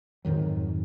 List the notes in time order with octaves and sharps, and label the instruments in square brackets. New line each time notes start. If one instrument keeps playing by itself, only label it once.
[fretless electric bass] F2 G#2 D#3 F#3